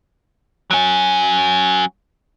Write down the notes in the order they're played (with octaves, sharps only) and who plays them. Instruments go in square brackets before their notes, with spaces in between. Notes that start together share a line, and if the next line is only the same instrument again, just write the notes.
[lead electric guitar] F#3 C#4